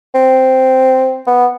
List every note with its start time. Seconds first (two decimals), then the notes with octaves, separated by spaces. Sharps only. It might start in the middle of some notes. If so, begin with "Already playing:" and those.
0.15 C4
1.27 B3